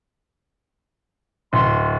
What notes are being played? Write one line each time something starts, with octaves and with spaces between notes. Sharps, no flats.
D1 C6